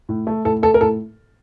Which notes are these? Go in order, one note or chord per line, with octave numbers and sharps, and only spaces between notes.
A2
A3
A2 A4
A3 A4
A#4
A2 A4